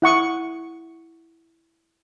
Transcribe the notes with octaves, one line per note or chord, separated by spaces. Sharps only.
E4 F#5 C#6 D#6